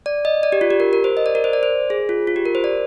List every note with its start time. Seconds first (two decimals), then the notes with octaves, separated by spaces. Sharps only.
0.06 D5
0.25 D#5
0.43 D5
0.52 G4
0.61 F4
0.70 G4
0.80 A#4
0.93 A#4
1.04 C5
1.17 D#5
1.26 D5
1.35 A#4
1.44 C5
1.53 D5
1.63 C5
1.90 G#4
2.09 F4
2.27 F4
2.36 G4
2.46 A#4
2.55 C5
2.64 D5